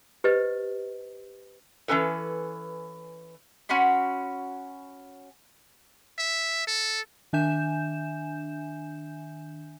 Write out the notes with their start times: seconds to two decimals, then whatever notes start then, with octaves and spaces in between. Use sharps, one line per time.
0.24 G4 B4 C5 D#5
1.88 E3 G#3 C#4 A4 B4
3.69 C#4 F#4 B5 C6
6.18 E5
6.67 A4
7.33 D#3 D4 E5 G#5 G6 E7